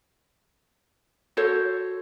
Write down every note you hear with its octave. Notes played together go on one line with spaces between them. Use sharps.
F#4 A4 C5 C#5